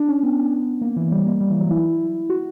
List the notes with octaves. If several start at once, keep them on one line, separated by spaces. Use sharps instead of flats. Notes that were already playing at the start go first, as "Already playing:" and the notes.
Already playing: D4
C#4
B3
A#3
E3
G3
A#3
G3
E3
F#3
E4
F#4